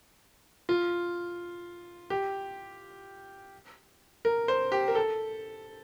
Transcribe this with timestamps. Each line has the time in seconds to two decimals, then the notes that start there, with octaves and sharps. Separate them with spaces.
0.69 F4
2.10 G4
4.25 A#4
4.48 C5
4.72 G4
4.88 A#4
4.95 A4